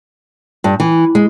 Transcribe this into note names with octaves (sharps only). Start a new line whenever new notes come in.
G2
E3
G#3